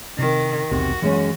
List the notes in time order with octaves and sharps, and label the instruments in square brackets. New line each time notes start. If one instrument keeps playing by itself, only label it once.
[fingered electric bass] C3 C4 [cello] D#3
[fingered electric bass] B1 E2 [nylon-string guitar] C3 [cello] F#4
[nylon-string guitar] F#2 G#3 C#4 [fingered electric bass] E3